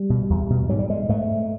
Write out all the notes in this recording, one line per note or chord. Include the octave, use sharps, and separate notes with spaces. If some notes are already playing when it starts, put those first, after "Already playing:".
Already playing: G3
B2
E2
B2
G#2 F#3
G3
G#3
G#2 A3